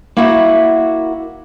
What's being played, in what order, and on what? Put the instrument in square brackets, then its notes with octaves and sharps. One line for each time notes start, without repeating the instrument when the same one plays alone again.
[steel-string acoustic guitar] A#3 E4 F#4 E5 F#5